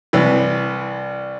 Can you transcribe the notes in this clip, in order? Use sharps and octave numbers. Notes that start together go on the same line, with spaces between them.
C2 E3